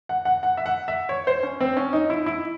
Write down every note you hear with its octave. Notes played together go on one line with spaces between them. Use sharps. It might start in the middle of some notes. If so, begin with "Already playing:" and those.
F#5
F#5
F#5
E5
F#5
E5
C#5
C5
C#4
C4
C#4
D#4
E4
E4